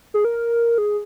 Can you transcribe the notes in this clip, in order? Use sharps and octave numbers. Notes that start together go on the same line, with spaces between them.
G#4
A#4
G#4